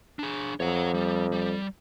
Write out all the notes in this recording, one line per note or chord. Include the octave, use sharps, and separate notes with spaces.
D4 G#4
F2 C#5 F#5
G3
G3